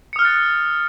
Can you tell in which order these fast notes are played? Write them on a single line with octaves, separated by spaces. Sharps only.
C#7 D#6 F6 F#6 A6